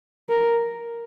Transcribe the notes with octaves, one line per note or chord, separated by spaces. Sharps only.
A#4